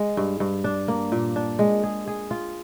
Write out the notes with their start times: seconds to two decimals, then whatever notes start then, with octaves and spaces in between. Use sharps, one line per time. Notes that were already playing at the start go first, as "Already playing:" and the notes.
Already playing: G#3
0.17 G2
0.40 G2
0.64 D4
0.88 A#3
1.12 A#2
1.36 D4
1.59 G#3
1.84 G#4
2.08 G#4
2.31 F4